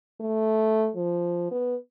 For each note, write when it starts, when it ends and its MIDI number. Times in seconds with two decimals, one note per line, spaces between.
0.20 0.89 57
0.96 1.47 53
1.51 1.75 59